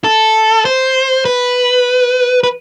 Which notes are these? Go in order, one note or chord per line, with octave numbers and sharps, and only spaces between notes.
A4
C5
B4
B4